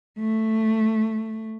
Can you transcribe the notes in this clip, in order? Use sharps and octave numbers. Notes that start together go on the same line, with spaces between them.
A3